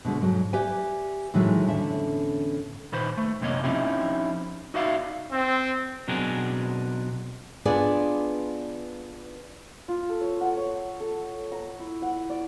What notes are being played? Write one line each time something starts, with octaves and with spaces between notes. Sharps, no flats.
B2 D3 G#3 A3
G#2 F#3
G4 B4 D5 E5 G#5
A2 D#3 E3 F#3 G#3 A3
E2 A2 D3 C#4 E5
A#2 D#3 B4 C5
A3
B1 F#2 C3 A#3 C#5 D#5
F3 C4 C#4 D#4 E4 G4
D#4 F#4 D5 E5 F5
C4
B2 F#3 C4 D4 G#4 A#4
B3 D4 F4 G#4 B4 D5
F4
A4
C#5
F#5
C#5
A4
A#5
E4
F#5
D5